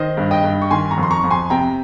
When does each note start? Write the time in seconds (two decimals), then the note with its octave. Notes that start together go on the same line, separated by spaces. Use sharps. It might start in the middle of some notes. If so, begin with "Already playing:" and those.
Already playing: D#3 C5 D#5
0.17 G2
0.31 D#5 G5
0.44 G2
0.62 C#6
0.71 D#3 G#5 C6
0.91 A#5 C#6
0.98 F2
1.03 C6
1.11 A#5 C#6
1.24 F2
1.31 G#5 C6
1.50 C3 G5 A#5